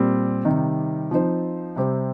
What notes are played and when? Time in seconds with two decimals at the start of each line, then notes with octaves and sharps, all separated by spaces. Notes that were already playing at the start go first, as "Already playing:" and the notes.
Already playing: A#2 G3 C4
0.45 C3 D#3 G3 D#4
1.11 F3 C4 D#4 C5
1.76 C3 G3 C4 G4 C5